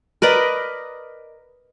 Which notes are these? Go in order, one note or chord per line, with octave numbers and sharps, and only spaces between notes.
A#4 B4 D5 D#5